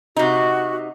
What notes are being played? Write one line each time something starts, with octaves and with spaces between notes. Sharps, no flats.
C3 D#4 F#4